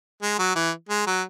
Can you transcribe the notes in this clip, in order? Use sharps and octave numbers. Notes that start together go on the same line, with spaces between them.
G#3
F#3
E3
G#3
F#3